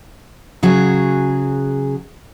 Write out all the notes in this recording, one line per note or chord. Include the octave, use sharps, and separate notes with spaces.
C#3 F#3 F#4 G#4